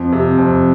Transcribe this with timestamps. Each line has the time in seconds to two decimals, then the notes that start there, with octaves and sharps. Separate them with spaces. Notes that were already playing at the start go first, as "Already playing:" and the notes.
Already playing: F2
0.12 C3
0.38 F2